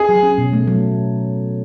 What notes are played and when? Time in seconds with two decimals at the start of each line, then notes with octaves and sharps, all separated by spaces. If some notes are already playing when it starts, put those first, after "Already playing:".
Already playing: G#4
0.09 F#3
0.23 C#4
0.38 B2
0.53 A3
0.68 F#3